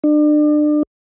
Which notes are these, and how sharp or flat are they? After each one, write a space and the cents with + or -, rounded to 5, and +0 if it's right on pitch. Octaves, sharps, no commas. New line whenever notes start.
D4 +35